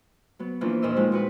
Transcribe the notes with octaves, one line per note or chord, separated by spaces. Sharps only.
F#3 B3
E3 F3 A#3 C#4 D4
D#2 A#2 B4 C5 D#5 E6
F3 G#3 C4 D#4 E4
A#2 F#4 B4